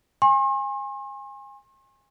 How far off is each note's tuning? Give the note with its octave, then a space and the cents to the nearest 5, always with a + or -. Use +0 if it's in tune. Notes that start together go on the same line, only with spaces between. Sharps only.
G#5 -25 C6 +45